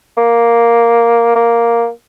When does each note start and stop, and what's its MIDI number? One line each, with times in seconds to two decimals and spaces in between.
0.17 1.32 58
1.36 1.88 58